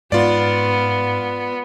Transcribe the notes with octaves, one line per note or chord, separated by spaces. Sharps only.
G#2 B3 F4 D5